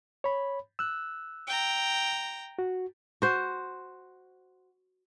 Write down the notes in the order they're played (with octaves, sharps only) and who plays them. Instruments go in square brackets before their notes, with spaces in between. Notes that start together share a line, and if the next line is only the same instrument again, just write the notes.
[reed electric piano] C#5 B5
E6 F#6
[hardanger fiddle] G5 A#5
[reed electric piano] F#4
[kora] F#4 C5